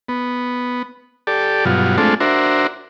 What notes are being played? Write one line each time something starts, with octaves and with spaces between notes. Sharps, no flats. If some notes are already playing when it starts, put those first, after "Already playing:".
B3
G4 A4 D5
G2 B2 F#3 F4
G#3 A3 C4 D4 F4 A4
D4 F#4 A#4 C5 E5